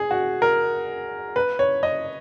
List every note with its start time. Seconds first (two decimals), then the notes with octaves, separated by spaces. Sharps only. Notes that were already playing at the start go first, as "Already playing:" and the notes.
Already playing: G#4
0.11 F#4
0.42 A#4
1.36 B4
1.59 C#5
1.83 D#5